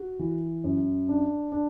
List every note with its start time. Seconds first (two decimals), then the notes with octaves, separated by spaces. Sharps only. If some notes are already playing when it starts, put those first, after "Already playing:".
Already playing: F#4
0.19 E3
0.64 F#2
1.09 D4
1.52 D4